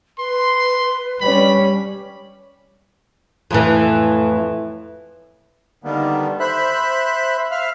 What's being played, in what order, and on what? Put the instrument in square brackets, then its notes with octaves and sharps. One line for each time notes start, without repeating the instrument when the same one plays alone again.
[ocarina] B4 [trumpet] C6
[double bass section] G3 C#4 [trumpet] B5
[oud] F2 A2 E3
[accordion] D3 D#3 G3 A#3 B3
C5 E5 B5 F#6
E5 F5 F6